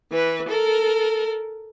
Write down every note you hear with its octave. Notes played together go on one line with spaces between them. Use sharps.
E3 B4
A4 A#4